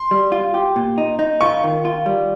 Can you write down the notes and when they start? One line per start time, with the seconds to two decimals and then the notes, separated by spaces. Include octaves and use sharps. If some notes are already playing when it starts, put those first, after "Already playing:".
Already playing: C6
0.11 G3
0.32 F4
0.54 G4
0.76 A#2
0.98 D#4
1.19 D#4
1.41 F4 C#6
1.64 D#3
1.85 F4
2.06 G3